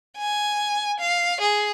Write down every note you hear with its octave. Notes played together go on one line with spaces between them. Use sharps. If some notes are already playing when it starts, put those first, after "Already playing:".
G#5
F5
G#4